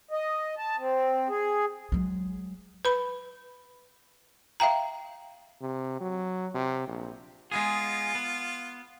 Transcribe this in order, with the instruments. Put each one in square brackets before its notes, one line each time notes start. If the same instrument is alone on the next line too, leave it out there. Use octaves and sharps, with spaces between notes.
[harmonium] D#5
A5
C4
G#4
[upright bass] F#3 G#3
[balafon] B4 B5
E5 F5 G5 A#5
[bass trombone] C3
F#3
C3
A#1
[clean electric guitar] G#3 B3 G#4 [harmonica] F4
[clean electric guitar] B3